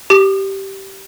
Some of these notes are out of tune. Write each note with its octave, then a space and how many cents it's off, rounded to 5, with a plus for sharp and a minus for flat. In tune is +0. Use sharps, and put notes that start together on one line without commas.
G4 -15 D#6 -40